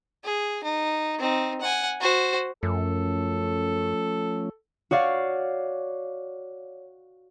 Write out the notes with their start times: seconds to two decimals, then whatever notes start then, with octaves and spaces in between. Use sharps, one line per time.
0.24 G#4
0.64 D#4
1.19 C4 D#4
1.61 F#5 G#5
2.00 F#4 C5
2.63 F#2 F3 A3 C#4 A4
4.91 F#4 C#5 D5 F5